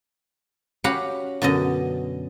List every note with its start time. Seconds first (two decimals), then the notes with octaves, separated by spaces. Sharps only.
0.84 C#4 F#4 G4 F5 F#5 B5
1.42 F#2 B2 D3 D#5